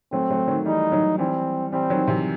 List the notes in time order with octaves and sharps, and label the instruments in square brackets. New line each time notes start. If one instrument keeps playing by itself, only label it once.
[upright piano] F#3 A3 [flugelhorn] C4
[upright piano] F#3 A3
D#3 F#3
[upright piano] E3 G3 [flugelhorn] D#4
[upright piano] D#3 F#3
[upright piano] E3 G3 [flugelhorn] C4
[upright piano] E3 G3 [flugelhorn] C4
[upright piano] D#3 F#3
C3 E3